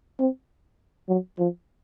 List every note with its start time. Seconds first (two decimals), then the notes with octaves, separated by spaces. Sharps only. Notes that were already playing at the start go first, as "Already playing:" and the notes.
0.20 C4
1.09 F#3
1.38 F3